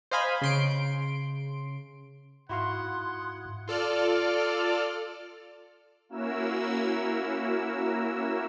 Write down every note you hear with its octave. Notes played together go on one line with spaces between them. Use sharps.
C5 D#5 F5 G#5 B5 C6
C#3 C6 D7
G#2 E4 F#4 F5 F#5 C6
F4 A4 D5 F6
A#3 C#4 E4 F#4 A#4 E6